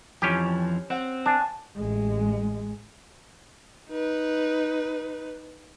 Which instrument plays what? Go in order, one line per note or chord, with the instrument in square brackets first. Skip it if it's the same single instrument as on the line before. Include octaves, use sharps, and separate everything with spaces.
[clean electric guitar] F2 E3 F3 [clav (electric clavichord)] C#4 G4
[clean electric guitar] C4 [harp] F#5
[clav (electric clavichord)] D4 [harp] G#5 A5
[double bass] A1 G#3
[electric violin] D#4 B4